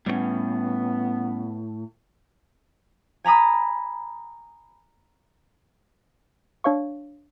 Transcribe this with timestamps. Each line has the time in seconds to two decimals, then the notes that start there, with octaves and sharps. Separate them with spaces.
0.06 A2 G3 A3 B3 C#4
3.24 G#5 A#5 B5 D#6
6.64 D4 C#5 F5 C#6